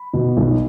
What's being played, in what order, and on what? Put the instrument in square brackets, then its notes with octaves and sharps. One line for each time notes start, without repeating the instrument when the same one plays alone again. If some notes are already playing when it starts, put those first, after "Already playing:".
Already playing: [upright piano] B5
B2
B1